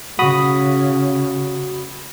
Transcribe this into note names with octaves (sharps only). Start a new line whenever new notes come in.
C#3 F#4 B5 D#6